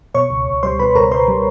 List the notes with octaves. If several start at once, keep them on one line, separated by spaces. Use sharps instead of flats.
B2 C#5 C#6
C#2
C#2
G3 C5 C6
B2 B4 B5
C#2 A#4 A#5
C#2 C5 C6
G3